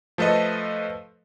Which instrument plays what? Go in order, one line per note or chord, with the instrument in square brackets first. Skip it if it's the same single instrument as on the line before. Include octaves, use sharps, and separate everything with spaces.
[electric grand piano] F3 A3 A4 B4 D#5